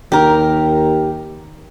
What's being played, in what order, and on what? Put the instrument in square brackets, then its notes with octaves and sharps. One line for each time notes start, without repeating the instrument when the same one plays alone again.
[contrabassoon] D#2 [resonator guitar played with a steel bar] G4 A#4